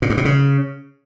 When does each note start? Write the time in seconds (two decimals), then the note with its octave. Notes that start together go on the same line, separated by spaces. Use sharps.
0.02 A#2
0.10 G2
0.17 B2
0.25 C#3